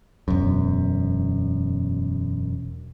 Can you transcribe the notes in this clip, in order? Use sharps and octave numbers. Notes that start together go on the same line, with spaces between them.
E1 F#2